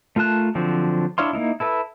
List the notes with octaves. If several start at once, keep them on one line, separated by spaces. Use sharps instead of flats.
A3 F4 A#4 A5 F#6
D3 F3 F#3 C4
D4 E4 C#5 F5 C6
A#3 B3 D#4 E4
E4 A4 B4 E5